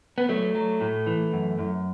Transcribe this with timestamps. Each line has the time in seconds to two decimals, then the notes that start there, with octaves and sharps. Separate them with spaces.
0.18 B3
0.29 F#3 A3
0.55 F#3
0.81 A2
1.07 E3
1.33 F#2
1.59 F#2